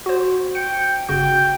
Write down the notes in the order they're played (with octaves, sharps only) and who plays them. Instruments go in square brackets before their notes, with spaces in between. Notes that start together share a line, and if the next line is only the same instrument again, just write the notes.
[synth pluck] F#4 C5
[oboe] G5 [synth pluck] C#7
[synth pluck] G1 C#3 F#4 [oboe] G5